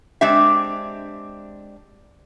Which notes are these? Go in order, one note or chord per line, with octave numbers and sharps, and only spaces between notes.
G#3 C4 D4 G4 E5